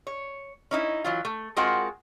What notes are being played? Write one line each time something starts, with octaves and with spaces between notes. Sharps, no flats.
C#5
C#4 D#4 E4
E3 F#3 F4
A3
G#3 C4 F4 F#4 A#4 F#5